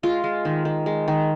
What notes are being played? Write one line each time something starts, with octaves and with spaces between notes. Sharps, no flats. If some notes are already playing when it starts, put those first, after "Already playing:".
G#3 F4
G#3
D#3
D#3
G#3
D#3